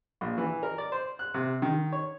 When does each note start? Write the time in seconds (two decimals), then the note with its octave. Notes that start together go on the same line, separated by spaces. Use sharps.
0.21 A#1
0.38 E3
0.63 A#4
0.78 D5
0.92 C5
1.19 F#6
1.34 C3
1.62 D#3
1.92 C#5